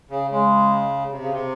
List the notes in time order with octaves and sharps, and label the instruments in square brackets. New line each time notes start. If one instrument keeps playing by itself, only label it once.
[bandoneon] C#3
[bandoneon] C#3 [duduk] G#3
[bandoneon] C3
C#3
C3